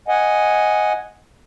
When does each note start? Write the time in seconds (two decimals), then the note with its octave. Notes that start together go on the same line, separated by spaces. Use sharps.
0.08 D#5 F#5 G#5